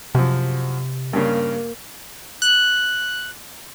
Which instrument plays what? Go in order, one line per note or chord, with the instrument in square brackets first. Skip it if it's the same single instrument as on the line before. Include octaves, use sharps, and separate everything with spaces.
[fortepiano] F#2 F3 [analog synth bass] C3
[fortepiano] G2 C#3 [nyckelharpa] A#3
[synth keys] F#6